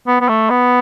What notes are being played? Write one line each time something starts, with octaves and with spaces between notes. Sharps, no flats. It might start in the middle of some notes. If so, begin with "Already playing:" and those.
B3
B3
A3
B3